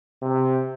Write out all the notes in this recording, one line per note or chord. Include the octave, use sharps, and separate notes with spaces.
C3